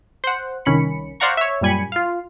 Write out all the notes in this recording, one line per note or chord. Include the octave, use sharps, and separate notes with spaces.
C5 F#5
C2 D#3 C#4 B5 C#7
C5 D5 F5 F#5 A#5 C#6
C#5 E5
F#2 A#2 G3 G#5 B5 C#7
F4 F5